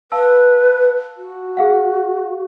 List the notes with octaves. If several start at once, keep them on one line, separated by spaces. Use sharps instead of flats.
B4 F5 A5 E6
F#4
G#4 F5 F#5